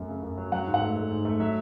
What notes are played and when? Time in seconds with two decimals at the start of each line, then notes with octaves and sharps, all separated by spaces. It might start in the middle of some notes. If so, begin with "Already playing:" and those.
Already playing: F#2 F#3 A3
0.08 C#3
0.23 F#2
0.37 F#3
0.52 F#3 F#5
0.67 G#2
0.74 F#5
0.81 A3
0.96 A3
1.10 G#2
1.25 A3
1.40 F#3 E5